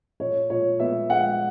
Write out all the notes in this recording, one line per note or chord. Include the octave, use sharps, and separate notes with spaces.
A#2 C#5
A#2 C#5
B3 E5
G#3 F#5